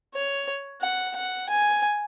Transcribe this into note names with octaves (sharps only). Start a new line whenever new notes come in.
C#5
F#5
F#5
G#5